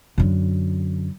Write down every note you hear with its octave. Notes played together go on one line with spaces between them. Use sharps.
F#2 D3